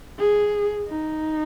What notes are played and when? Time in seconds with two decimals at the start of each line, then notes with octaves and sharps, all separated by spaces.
0.19 G#4
0.88 D#4